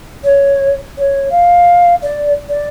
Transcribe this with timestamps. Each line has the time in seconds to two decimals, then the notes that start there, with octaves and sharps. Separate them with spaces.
0.24 C#5
0.97 C#5
1.30 F5
2.02 D5
2.49 D5